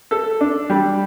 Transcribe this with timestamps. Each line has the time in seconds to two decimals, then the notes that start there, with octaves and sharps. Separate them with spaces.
0.11 A4
0.41 D4
0.70 G3